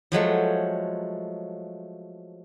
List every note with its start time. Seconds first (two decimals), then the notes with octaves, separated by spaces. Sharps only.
0.12 F3 F#3 G#3 A3